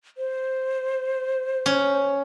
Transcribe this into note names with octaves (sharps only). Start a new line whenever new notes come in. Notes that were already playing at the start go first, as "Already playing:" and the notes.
C5
C#4